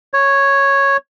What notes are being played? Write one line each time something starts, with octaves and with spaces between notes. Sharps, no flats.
C#5